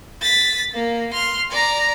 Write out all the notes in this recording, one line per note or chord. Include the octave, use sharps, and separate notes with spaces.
A6 B6
A#3
C6 F6
D5 A#5